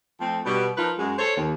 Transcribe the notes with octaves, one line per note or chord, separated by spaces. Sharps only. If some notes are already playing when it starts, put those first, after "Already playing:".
F3 A3 C4
B2 G3
F3 D#4 F4 A#4 B4
F#2 G#3
A4 C5 C#5
D#2